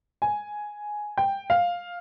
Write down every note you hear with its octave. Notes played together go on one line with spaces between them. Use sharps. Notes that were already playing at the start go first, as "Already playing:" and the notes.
G#5
G5
F5